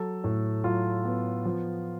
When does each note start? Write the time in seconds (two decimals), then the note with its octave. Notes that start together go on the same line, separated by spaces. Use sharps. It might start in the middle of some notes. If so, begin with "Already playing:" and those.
Already playing: F#3 A4
0.24 A2
0.64 F#3 F4
1.04 B3
1.45 F3